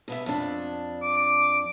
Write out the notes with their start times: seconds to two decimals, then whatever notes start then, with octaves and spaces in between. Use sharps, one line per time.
0.08 B2 B3 E5
0.26 F2 D4
1.02 D6